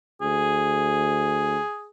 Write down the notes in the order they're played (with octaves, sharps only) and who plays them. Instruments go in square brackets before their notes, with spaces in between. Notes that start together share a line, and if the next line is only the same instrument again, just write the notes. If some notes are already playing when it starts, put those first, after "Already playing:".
[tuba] D2 [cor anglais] G#4